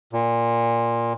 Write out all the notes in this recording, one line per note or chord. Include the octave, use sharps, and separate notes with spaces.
A#2